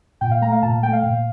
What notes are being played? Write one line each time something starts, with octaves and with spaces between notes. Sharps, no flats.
A#2 G5
F5
A3 A#5
F5
A#2 A5
A3 G5
F5
A#2